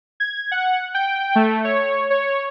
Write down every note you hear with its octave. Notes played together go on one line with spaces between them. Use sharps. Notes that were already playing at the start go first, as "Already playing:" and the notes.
G#6
F#5
G5
A3
C#5
C#5